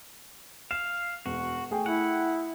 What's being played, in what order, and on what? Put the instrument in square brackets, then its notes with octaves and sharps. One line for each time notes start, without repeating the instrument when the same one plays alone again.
[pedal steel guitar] F5 [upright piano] E7
[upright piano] E1 [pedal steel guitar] F#4
[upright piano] A3 G#4 G5
[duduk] E4 [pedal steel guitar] F#5